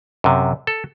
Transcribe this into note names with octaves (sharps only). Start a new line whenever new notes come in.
F#2 C3
A4